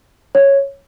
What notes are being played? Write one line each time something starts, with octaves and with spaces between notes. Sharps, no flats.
C#5